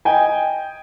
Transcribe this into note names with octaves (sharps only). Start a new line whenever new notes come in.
D#5 G5 G#5